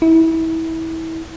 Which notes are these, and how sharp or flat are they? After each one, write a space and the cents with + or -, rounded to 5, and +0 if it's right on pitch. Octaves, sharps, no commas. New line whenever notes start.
E4 -25